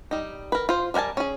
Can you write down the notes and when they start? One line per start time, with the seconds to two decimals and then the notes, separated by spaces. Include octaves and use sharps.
0.11 G3 D#4
0.52 A#4 B4
0.69 F4 C5
0.94 G3 A#4 F#5 G#5 A5
1.17 C#4 G#4